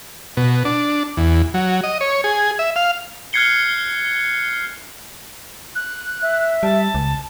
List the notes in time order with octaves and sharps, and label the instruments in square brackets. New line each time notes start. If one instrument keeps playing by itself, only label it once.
[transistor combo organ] B2
D4
E2
F#3
D#5
C#5
G#4
E5
F5
[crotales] F6 F#6 G#6 C7 C#7 G7
[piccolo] F#6
[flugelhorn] E5
[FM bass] G3 [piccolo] A5
[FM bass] C#2